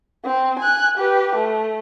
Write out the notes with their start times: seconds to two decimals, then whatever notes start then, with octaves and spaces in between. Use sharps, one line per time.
0.25 C4
0.59 G#5 F#6
0.98 G4 B4
1.36 A3